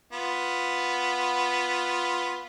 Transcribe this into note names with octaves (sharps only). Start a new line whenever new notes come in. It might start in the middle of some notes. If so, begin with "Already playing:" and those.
B3 F4